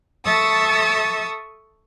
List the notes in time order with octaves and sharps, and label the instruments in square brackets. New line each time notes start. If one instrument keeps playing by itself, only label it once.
[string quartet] A4 E5 A5 C#6 D#6 E6